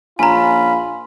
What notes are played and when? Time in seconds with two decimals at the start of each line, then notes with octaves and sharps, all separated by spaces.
0.19 A#1 C#4 F4 G#5 A#5 B5